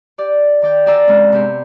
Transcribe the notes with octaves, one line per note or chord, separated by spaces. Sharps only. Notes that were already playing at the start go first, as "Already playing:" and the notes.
G4 D5
D#3 D5 G5
F#4 A#4 D5 G#5 A#5 E6
G#2 G#3 C4 C#4
C3 B3 G4 C6